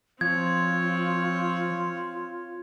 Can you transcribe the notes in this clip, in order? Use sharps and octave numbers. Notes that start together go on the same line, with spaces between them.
F3 C4 F4 C#5 G#6